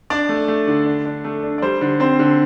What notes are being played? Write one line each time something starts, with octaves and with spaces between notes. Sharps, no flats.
D4 D5
A3
A3
D3
D4
D4
A3
D4
D5
G3 C5
D3
C4 C5
D3